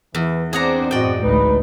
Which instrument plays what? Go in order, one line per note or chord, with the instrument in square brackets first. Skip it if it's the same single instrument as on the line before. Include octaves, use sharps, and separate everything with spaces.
[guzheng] E2 [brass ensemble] E3
[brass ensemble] C4 [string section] D4 C5 D5 [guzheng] G#4 F#5 A#5
[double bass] F#2 A2 [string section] F#4 D#5 [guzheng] D5 G5
[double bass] A1 D2 [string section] A2 G#3 D#4 [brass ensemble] B4